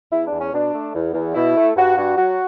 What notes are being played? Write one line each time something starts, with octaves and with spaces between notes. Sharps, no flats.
E2 E4
D4
E2
C#4
B2 D4
A3
E2
E2
B2 E4
A3
G2 F#4
G2 F#4
F#3 F#4